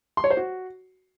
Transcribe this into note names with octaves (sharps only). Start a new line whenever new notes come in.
C6
C#5
C5
F#4